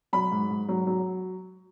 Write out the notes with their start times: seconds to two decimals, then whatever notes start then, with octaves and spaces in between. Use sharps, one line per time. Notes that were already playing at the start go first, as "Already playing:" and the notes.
0.13 F#3 B5
0.31 G#2
0.50 G#2
0.69 F#3
0.87 F#3